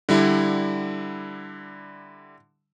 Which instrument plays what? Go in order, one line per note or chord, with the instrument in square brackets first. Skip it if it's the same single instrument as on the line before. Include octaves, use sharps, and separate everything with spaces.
[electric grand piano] D3 G3 E4